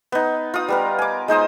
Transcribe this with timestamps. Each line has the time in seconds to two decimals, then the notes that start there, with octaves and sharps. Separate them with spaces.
0.12 B3 D#4
0.54 F4 D#6
0.68 G3 B3 A#4
0.99 G#5 D6
1.28 G#3 D#4 C5 D#6